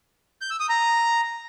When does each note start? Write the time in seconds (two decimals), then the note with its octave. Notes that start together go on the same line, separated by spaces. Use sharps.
0.41 G6
0.51 E6
0.60 D#6
0.69 A#5